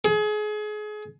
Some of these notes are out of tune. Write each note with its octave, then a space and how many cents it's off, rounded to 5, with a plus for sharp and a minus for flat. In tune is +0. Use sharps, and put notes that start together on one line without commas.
G#4 +30